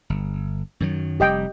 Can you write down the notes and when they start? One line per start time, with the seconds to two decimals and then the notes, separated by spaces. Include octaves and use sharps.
0.10 G1
0.80 F#2 D#3 F#3
1.20 F1 G3 G4 D#5 G5